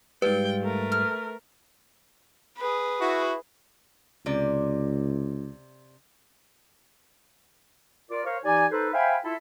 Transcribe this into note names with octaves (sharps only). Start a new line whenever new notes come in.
G#2 G3 F4 B4 G5
A3 A#4
F6
G#4 B4
E4 F#4
C#2 C3 D5
F4 A#4 D5
A#4 C5 C#5 F5
E3 D#4 G4 D5 G#5
D#4 A4 B4 C5
C5 E5 F5 G5 G#5 B5
E4 F4 A4 E5